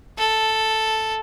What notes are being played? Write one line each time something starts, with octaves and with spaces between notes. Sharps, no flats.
A4